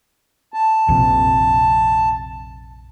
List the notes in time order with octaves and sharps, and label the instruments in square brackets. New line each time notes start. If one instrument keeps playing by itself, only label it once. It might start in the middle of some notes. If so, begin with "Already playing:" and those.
[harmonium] A5
[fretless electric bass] A#1 F2 C3